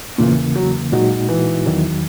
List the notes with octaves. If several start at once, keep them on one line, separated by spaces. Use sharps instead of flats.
E2 A#2 C#3 E3 A#3
F#3
A#2 F#3 G#3 D#4 F#4
E3
E2 D#3 F#3